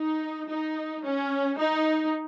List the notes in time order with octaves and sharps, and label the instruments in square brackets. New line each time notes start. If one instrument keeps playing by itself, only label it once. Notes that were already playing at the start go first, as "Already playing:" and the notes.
Already playing: [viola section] D#4
D#4
C#4
D#4